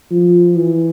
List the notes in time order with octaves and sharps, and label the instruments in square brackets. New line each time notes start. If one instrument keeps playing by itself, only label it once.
[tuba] F3
E3